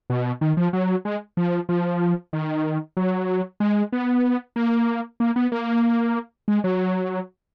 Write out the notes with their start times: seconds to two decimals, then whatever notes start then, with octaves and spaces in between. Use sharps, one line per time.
0.10 B2
0.41 D#3
0.57 F3
0.73 F#3
1.05 G#3
1.37 F3
1.69 F3
2.33 D#3
2.97 F#3
3.60 G#3
3.92 B3
4.56 A#3
5.20 A#3
5.36 B3
5.52 A#3
6.48 G#3
6.64 F#3